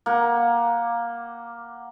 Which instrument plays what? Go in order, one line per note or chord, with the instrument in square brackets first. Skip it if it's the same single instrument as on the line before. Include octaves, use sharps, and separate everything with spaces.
[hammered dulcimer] A#3 F#5